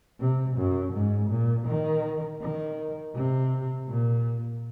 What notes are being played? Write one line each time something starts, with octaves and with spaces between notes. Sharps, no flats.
C3
F#2
G#2
A#2
D#3
D#3
C3
A#2